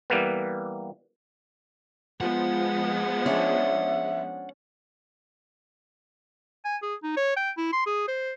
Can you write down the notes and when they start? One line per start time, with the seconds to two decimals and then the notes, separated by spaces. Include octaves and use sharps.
0.10 E3 G3 A#3 B3
2.21 F3 G#3 B3 F4 F#5
3.26 C#4 D4 G#4 E5
6.65 G#5
6.83 G#4
7.03 D#4
7.17 C#5
7.37 G5
7.58 E4
7.73 C6
7.86 G#4
8.08 C5